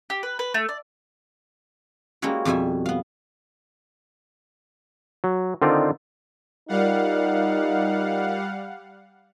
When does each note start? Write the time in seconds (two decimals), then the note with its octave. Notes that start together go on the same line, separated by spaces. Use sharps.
0.10 G4
0.23 B4
0.39 B4
0.54 A3
0.69 D5
2.22 G3 G#3 A#3 C#4 E4 F#4
2.45 F2 B2 G3 E5 G#5
2.86 B3 F5
5.24 F#3
5.62 D3 D#3 C4 D#4 F4 D5
6.69 G3 D#4 F4 A#4 D5 F5 F#5